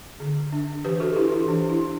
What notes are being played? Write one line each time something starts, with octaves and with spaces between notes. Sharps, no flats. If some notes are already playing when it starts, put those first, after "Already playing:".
D3
D4
E3 G4 B4
F#4 A4
D4 E4 G4
E4
E3 D4
E4
D4